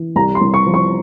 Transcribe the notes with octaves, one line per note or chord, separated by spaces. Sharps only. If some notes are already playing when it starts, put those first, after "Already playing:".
Already playing: E3
C2 A#5
C6
C2
C#6
F3
C#6